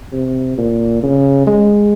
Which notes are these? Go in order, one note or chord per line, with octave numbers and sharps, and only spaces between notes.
C3
A#2
C#3
G#3